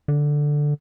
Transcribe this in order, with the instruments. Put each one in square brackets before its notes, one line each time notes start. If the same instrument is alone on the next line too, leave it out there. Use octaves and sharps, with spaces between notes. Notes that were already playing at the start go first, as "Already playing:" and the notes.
[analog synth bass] D3